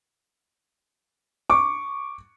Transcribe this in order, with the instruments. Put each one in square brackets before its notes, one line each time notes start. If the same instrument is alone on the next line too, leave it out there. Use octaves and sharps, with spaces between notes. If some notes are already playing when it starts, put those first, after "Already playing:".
[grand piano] C#6 D6